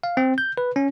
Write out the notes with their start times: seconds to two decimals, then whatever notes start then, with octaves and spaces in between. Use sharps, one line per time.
0.03 F5
0.17 C4
0.38 G6
0.58 B4
0.76 C#4